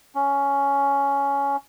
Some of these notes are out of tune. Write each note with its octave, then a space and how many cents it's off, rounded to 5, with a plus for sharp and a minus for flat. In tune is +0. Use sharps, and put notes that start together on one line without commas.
C#4 +10